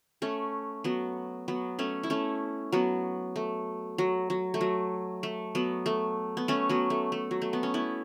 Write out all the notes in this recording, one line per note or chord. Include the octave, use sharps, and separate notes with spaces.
A3 C#4
F#3 B3
F#3 B3
A3 C#4
E4
A3 C#4
F#3 B3
A3
F#3
F#3
A3
F#3
A3
F#3 B3
A3
B3
A3 C#4
F#3 B3
A3
A3
F#3
A3
B3
C#4
B3 E4